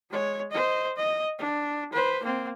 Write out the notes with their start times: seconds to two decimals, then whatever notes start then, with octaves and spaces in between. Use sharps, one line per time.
0.11 G#3 C#5
0.52 C5 D#5
0.96 D#5
1.39 D4
1.93 B4 C5
2.23 A#3 C4